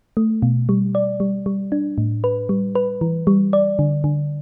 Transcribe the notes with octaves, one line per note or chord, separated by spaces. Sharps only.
A3
B2
G3
D5
G3
G3
D4
A2
B4
G3
B4
E3
G3
D5
D3
D3